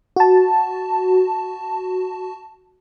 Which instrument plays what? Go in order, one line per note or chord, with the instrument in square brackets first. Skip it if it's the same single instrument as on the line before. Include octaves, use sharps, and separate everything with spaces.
[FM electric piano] F#4 A5